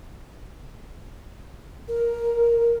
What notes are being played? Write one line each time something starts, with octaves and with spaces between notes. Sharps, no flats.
A#4